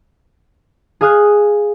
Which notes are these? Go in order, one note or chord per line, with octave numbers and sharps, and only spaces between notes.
G#4 F5 G#5 D#6 F6 F#6